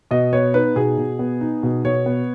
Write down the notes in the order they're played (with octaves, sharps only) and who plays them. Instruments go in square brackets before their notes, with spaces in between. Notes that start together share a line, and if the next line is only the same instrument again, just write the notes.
[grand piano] B2 D#5
B3 C#5
D#4 B4
B2 G#4
B2
B3
D#4
B2
B2 C#5
B3